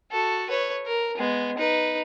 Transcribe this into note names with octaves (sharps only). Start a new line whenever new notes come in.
F#4 A4
B4 C#5
A#4
G#3 B3
D#4 B4